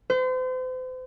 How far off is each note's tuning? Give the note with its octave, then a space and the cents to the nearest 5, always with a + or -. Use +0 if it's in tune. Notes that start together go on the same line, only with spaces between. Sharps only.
C5 -40